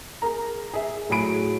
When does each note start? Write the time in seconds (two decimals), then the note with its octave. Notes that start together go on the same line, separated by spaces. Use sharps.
0.22 G#4 A#4 A#5
0.74 G#4 E5
1.09 A2 F#3 F#4 G#4 B5 D7